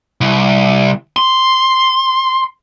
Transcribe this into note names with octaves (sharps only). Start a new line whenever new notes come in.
C2
C6